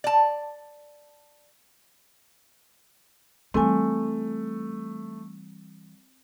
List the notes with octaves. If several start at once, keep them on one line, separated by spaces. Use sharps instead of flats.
D5 A5
E3 G3 A3 C4 G#5